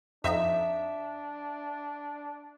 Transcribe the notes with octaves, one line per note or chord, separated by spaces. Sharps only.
F2 D4 D#4 E5